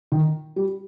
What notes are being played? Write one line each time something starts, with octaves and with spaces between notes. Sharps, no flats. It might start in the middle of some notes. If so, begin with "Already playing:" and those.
D#3
G3